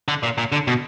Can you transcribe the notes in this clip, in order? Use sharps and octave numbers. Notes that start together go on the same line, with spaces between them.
D3
A#2
A#2
D3
B2